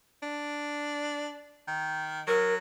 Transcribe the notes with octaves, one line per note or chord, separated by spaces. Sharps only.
D4
D#3
F#3 A#4